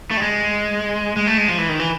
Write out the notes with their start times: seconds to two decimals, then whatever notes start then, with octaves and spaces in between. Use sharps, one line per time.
0.11 A3
0.17 G3
0.22 G#3
1.17 G#3
1.27 A3
1.38 G#3
1.48 F3
1.58 E3
1.69 D#3
1.79 E3